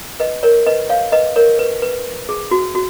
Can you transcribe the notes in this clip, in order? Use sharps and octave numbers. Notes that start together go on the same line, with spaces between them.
B4 D#5
A#4 C#5
B4 D#5
C#5 F5
B4 D#5
A#4 C#5
B4
B4
G#4
F#4
F#4